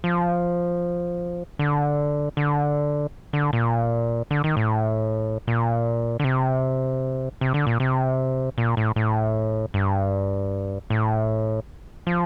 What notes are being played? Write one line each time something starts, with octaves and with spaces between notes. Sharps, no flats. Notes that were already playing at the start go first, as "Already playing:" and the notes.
F3
D3
D3
D3
A#2
D3
D#3
A2
A#2
D3
C3
C3
D3
A#2
C3
A#2
A2
A2
G2
A2
F3